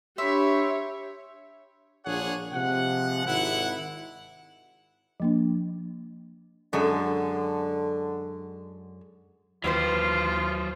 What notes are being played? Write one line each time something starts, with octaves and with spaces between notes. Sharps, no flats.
D4 G4 C#5 E5 B5 C6
A#1 A#2 D4 G#4 C#5 F#5
C3 F3 G#3 F#5
G#1 E4 F#5
F3 A#3 D4
F#2 D3 G#3 A4
D#2 D#3 E3 F#3 F4 B4 C5